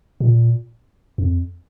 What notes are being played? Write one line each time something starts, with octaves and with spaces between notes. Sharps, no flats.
A#2
F2